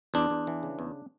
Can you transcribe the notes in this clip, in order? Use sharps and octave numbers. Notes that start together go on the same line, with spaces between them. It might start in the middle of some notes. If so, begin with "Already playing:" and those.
E2 D4
E2
E3
C#3
E2